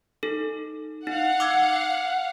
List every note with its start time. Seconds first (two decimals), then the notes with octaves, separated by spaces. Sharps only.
0.23 D#4 A4
1.07 D#4 F5 F#5
1.40 D6 E6 G#6